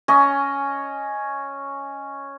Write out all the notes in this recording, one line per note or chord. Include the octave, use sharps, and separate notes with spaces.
C#4 D#5